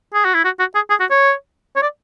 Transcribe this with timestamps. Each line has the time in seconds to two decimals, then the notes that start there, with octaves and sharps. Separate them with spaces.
0.14 G#4
0.24 F#4
0.34 E4
0.45 F#4
0.59 F#4
0.75 G#4
0.90 G#4
1.00 F#4
1.11 C#5
1.76 C#5
1.82 D5